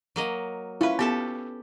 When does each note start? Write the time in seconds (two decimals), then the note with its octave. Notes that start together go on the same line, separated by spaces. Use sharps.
0.16 F#3 A#3 D#5
0.81 C#4 E4 F4 B4
0.99 B3 G4 A4 A5